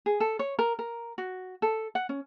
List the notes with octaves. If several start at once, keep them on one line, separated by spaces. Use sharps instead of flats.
G#4
A4
C#5
A#4
A#4
F#4
A4
F#5
C#4